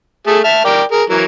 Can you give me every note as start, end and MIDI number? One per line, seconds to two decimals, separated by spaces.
0.27 0.39 57
0.27 0.39 68
0.27 0.39 69
0.44 0.60 76
0.44 0.60 81
0.44 0.60 89
0.65 0.83 70
0.65 0.83 74
0.65 0.83 79
0.92 1.03 68
0.92 1.03 70
1.10 1.25 52
1.10 1.25 54
1.10 1.25 70